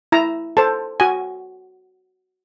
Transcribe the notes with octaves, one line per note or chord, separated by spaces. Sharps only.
E4 A#5
A4 C5 A5
F#4 G#5